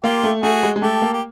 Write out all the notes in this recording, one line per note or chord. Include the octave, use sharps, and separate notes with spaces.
A#3 F4 G4
A3
A3 F#4 G#4
G#3
G#3
A3 G4 A4
A#3
G4